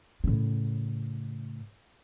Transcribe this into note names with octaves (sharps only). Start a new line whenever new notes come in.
A2 C#3